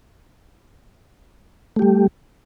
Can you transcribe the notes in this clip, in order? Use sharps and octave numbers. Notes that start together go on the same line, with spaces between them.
G3 A3 G4